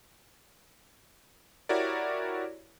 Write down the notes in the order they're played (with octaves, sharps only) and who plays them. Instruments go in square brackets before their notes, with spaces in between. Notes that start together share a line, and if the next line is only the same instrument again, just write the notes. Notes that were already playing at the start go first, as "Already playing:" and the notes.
[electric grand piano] E4 F#4 G4 A#4 C#5 D5